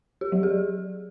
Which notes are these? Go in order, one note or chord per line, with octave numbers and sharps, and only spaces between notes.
G4
F#3
G#4